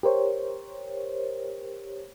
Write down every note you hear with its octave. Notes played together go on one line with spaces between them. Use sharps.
G4 A#4 C5 C#5